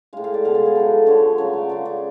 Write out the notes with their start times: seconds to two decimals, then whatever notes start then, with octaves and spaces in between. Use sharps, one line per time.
0.13 A2 G#3 F5
0.24 F5
0.34 D5
0.44 B2 G#3 F5
0.55 D5
0.66 G#4
0.75 A2 F#3 A3 A4
1.06 D3 F3 G#3 C#5
1.38 C#3 F#3 A3 C#5
1.53 D5
1.69 C#3 G#3 D5
1.85 D5